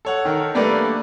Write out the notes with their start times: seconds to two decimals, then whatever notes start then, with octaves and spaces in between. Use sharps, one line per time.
0.05 A4 C#5 F#5
0.25 D#3 A4 A#4
0.55 G3 A3 A#3 D4 B4 D5